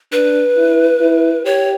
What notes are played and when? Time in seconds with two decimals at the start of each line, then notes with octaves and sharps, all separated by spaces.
0.12 D4 B4
0.57 E4
1.01 E4
1.45 G4 C#5